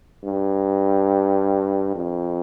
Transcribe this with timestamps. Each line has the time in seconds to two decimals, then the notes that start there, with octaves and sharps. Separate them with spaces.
0.24 G2
1.95 F2